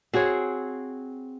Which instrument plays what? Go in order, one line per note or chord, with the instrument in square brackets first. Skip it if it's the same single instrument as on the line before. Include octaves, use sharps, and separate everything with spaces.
[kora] C4 F#4 G#4 C#5